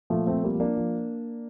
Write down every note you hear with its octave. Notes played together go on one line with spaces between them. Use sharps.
A#2 F3 A3
A3 C4
F3
G3 A#3
F3
A#3 D4
F3